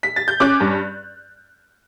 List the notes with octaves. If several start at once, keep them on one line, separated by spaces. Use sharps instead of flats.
B6
A6
G6
C#4 D6 F#6
G2